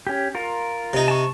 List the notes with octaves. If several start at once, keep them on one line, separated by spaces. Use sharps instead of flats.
C#4 G4
F4 A#4
C3 D#4
A5 C#6